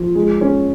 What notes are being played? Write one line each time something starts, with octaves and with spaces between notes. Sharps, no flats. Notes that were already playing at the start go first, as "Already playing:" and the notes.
Already playing: F3
G#3
C#4